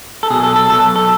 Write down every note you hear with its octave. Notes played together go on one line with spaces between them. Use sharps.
A4
B1 B2 F#3 G#4
A4
A4
B1 B2 F#3 A4
A4